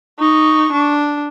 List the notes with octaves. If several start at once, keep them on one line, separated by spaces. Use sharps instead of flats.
D#4 C#6
D4